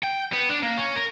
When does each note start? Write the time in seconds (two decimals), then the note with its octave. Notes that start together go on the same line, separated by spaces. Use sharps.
0.03 G5
0.32 B3
0.49 D4
0.63 A#3
0.78 C#4
0.96 A#4